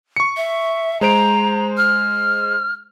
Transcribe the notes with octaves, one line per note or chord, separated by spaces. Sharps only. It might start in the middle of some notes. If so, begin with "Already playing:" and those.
C#6 C#7
E5
G#3 C5 A#5 D7
F6